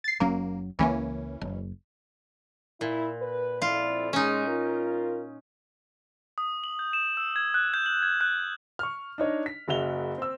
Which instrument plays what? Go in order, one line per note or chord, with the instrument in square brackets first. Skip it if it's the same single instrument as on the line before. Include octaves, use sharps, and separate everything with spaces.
[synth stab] A6 C7
[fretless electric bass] F#1 F#3 C#4 [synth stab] A#3
[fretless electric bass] C#2 A3 A#3 [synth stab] E3 C#4
[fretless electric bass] F#1
[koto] A#2 [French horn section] E4
[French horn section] B4
[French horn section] F2 E4 D5 [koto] F4
[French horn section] G#3 [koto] C#4 D#4
[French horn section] F4 A#4
[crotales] D#6
F#7
G6
E7
E6
G#6
F#6
G6
F#7
G#6
F#6
[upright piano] C#6 F6
D4 D#4 C#5 D#5
B6
F#1 C#3 F#4 E5 F7 G7
C4 E6